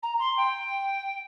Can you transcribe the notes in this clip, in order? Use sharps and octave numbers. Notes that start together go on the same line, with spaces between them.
A#5
C6
G5